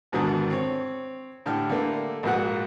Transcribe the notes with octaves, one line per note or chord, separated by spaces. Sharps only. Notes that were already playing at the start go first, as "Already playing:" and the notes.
E2 G#2 B2 D3 D#3
C4 C#5
A2 D3 G4 F6
D3 G3 A3 A#3
A#1 G#2 A#3 F#4 F#5